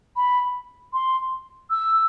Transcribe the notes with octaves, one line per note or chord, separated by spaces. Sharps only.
B5
C6
E6